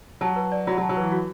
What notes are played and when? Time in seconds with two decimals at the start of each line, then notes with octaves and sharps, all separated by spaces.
0.21 F#3 A5
0.36 B4
0.52 D5
0.67 F#3 F#4
0.78 F#3
0.81 A5
0.89 F#3
0.97 E3 B4
1.12 F#4